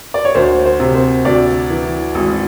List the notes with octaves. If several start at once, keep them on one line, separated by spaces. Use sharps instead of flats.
D5
C#5
D2 C5
C5
C3
C5
D2 D5
E3
G#1